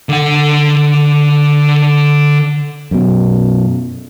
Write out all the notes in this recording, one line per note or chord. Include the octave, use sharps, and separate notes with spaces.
D3 F#5
F#2 B2